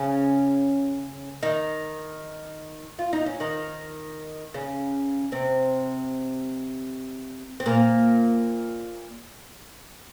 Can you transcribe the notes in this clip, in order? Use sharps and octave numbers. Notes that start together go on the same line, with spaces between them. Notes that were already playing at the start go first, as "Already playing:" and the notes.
Already playing: C#3 C#4
D#3 D#4
F4
D#4
C#4
D#3 D#4
C#3 C#4
C3 C4
C4
A#2 A#3